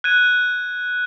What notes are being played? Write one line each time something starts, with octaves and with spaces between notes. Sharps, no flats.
F#6 G#6 D#7